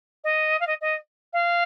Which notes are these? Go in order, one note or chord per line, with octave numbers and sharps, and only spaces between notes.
D#5
F5
D#5
D#5
F5